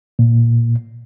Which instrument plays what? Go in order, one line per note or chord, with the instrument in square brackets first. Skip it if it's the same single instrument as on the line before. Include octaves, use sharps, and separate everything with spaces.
[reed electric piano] A#2